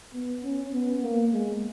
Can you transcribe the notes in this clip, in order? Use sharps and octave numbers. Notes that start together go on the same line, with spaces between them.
B3
C#4
B3
A#3
G#3